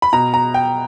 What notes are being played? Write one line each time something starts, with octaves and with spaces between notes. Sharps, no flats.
B5
B2 A#5
A#5
G5